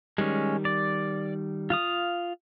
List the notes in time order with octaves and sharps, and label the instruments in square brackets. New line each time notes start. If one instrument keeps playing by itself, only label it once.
[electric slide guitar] D#3 G3 [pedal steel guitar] G#3 C#4
[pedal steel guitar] D5
F4 F5 D#6